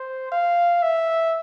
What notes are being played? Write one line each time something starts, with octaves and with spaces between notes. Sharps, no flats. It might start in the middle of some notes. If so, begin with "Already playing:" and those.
Already playing: C5
F5
E5